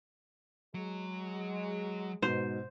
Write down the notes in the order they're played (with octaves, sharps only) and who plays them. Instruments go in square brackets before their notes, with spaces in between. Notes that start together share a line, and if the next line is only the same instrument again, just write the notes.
[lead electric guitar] F#3 [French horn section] G#3
[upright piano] G#2 B2 [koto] C5